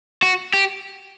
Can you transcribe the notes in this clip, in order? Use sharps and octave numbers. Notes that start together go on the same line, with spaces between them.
F#4
G4